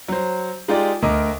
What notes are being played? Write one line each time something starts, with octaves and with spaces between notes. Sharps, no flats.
F#3 C5
G#3 D#4 F4 G4 D5 G5
D2 A#4 D#5 D6